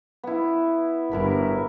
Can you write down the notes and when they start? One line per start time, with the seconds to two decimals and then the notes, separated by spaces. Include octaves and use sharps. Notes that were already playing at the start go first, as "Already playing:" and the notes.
0.23 B3 E4
1.11 G1 E4 A#4 B4